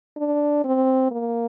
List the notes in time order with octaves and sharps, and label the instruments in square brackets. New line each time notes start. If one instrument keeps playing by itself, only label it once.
[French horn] D4
C4
A#3